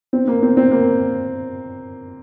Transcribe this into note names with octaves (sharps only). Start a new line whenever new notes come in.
C4
A#3
C4
C4
A#3